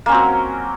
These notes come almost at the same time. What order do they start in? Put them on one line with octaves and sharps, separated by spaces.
A#3 C#4 C4 F#3